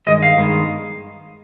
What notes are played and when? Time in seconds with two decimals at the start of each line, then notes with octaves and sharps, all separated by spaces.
0.07 G2 D#3 G#3 D#5
0.23 F5
0.38 G2 D#3 G#3 B3